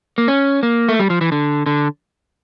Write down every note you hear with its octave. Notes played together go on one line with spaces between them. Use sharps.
A#3
C#4
A#3
A3
G3
F3
E3
D3
D3